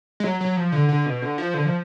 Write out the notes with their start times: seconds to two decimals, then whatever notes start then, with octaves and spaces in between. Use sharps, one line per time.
0.20 G#3
0.24 F#3
0.41 F#3
0.57 F3
0.72 D3
0.89 D3
1.06 B2
1.22 D3
1.38 F3
1.54 D3
1.65 F3